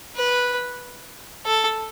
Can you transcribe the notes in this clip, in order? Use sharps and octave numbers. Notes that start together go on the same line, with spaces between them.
B4
A4